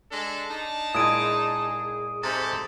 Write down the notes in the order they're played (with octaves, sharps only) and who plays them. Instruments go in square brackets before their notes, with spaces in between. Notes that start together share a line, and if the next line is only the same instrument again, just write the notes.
[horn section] G#3 D4 A4
D4 D#4 A5
[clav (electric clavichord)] A#2 G#3 E4 [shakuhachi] G#4 [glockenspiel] D#6 D7 D#7
[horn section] G#2 C3 A4 [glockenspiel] A6